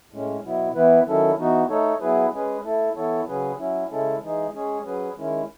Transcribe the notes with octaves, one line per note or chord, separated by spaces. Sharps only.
A2 G#3 C#4
B2 F#3 B3 E4
E3 B3 E4 B4
D#3 F#3 C#4 E4 A4
E3 B3 D#4 F#4
A3 D#4 A4 C#5
F#3 B3 E4 G#4 B4
G#3 C#4 G#4 B4
A3 E4 A4
E3 B3 E4 A4 C#5
C#3 F#3 C#4 G#4 B4
F#3 C#4 E4
C#3 G#3 C#4 E4 A4
E3 G#3 D#4 G#4
G#3 C#4 G#4 C#5
F#3 C#4 G#4 B4
D#3 G#3 C#4 E4